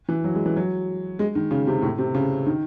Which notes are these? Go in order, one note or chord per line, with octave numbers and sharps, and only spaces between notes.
E3
F#3
G#3
E3
F#3
G#3
D#3
C#3
C3
A2
C3
C#3
D#3